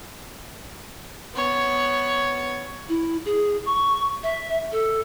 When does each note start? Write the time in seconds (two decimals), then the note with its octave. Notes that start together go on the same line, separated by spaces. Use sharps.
1.35 B3 C#5
2.89 E4
3.25 G#4
3.66 C#6
4.23 E5
4.72 A4